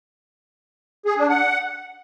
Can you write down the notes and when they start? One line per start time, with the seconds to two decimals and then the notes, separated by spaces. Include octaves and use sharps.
1.06 G#4
1.18 D4
1.29 F#5